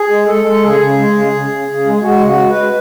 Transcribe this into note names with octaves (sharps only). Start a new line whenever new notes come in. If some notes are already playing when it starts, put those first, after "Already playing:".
Already playing: G#4
G#3
G#3 A4
G#3
C#3 G#4
C#3
G#3
C#3
C#3
C#3
C#3
G#3
G#4
G#3 F#4
C#3
F#4
G#3
B4
G#3